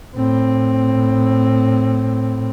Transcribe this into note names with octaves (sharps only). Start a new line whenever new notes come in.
A2 C4